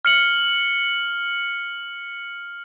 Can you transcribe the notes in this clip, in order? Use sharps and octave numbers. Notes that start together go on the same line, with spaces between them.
F6 C#7 F#7